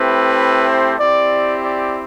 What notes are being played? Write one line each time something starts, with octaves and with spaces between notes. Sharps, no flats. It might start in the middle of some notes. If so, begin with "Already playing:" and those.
Already playing: A3 C4 E4 G4 B4
C5
C4 E4 G4 D5
D5